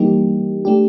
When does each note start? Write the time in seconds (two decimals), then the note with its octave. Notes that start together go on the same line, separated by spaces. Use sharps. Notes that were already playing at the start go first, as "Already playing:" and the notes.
Already playing: E3 G3 A#3 D#4 G4
0.65 A3 D4 G4